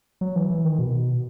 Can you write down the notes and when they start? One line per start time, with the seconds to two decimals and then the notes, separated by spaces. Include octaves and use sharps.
0.21 F#3
0.36 E3
0.50 E3
0.65 D#3
0.79 B2